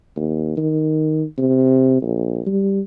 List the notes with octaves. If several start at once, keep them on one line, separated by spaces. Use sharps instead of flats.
D#2
D#3
C3
A#1
G3